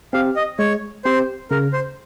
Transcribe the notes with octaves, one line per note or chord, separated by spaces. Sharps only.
C4 G4 F5
D#5
G#3 C#5
C4 G4 C5
C#3 A#4
C5